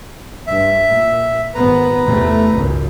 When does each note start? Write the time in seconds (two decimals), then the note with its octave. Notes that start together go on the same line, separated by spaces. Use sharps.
0.47 G2 E5
0.87 A#2
1.55 G#1 B3 B4 A#5
2.06 E2 C3 A3
2.52 G#1 C#2 F#2